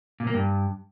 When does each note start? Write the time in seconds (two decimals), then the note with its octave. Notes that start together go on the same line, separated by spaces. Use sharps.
0.20 A#2
0.27 A#3
0.34 G2